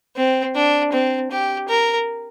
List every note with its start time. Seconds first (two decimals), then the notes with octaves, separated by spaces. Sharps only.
0.16 C4
0.55 D4
0.92 C4
1.31 G4
1.69 A#4